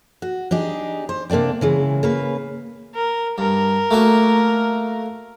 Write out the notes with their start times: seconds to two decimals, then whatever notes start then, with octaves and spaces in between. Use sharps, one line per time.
0.22 F#4
0.51 D4 D#4 G4 G#4
1.09 C5
1.30 C3 A#3 D4 D5 G5
1.61 C#3 E3 G#3
2.03 C#3 A#3 B4
2.95 A#4
3.38 G2 A#4
3.91 A3 A#3 F#4